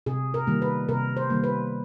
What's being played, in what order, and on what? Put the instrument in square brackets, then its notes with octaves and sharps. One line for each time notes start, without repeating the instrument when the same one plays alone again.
[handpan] C3 G#4
A#4
D#3 G3 A#3
B4
C3 A#4
C5
D#3 G3 A#3
B4